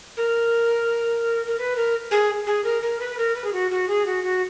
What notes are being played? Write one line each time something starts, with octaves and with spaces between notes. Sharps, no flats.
A#4
A#4
B4
A#4
G#4
G#4
A#4
A#4
B4
A#4
B4
G#4
F#4
F#4
G#4
F#4
F#4